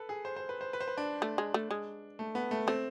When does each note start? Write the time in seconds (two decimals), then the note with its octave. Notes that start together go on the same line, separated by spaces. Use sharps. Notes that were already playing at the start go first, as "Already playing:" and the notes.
Already playing: A4 B4
0.09 G#4
0.25 C5
0.36 C5
0.49 B4
0.61 C5
0.73 B4
0.80 C5
0.88 B4
0.97 D4
1.22 A3
1.38 G#3
1.54 A3
1.71 G#3
2.19 A3
2.35 B3
2.51 A3
2.67 A3 C4